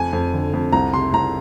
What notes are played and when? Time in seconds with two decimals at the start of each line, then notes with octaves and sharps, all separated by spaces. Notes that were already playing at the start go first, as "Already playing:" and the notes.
Already playing: F2 G#5
0.13 F2
0.33 D3
0.54 F2
0.73 C2 A#5
0.93 C3 C6
1.13 C2 A#5